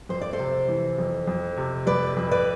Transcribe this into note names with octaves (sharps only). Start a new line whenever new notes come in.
F2 C5
D5
A4 C5
C3
E3
F2
F2
C3
F2 B4 D5
F2
B4 D5